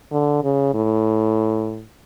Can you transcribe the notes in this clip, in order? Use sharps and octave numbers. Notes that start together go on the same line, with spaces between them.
D3
C#3
A2